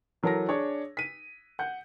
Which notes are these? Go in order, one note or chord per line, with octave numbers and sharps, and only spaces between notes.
E3 F#3 A4 A#4 A5 A#6
D4 G#4 C#5
B6 D#7
F#5 G6